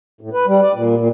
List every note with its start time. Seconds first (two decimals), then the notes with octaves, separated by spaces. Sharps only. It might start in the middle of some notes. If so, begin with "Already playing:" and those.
0.21 A2
0.33 B4
0.47 G3
0.62 D5
0.74 A#2
0.97 A#2